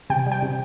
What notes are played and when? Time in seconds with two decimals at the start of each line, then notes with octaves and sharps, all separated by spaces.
0.10 C3 G5
0.26 G3
0.32 G5
0.42 C3